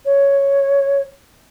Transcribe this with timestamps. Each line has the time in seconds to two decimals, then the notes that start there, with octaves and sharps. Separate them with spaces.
0.05 C#5